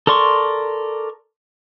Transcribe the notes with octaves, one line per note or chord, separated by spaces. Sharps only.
A4 A#4 D5 C6 C#6